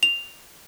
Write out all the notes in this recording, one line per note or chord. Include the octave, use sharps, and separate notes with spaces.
F7